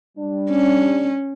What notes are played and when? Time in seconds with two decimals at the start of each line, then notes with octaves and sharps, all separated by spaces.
0.17 G3 D4
0.51 C#4